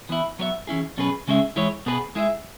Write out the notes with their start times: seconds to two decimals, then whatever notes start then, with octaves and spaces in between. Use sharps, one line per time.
0.09 E3 B3 E4
0.39 F#3 B3 F#4 C#5 E5
0.67 E3 C#4 E4 G#4
0.97 B2 F#3 C#4 G#4 B4
1.27 C#3 G#3 C#4 G#4 E5
1.56 E3 G#3 E4 C#5
1.86 B2 B3 G#4 B4
2.15 G#3 E4 G#4 E5